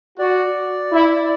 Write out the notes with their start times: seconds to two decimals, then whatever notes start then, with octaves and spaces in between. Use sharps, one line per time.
0.18 F#4 D5
0.93 E4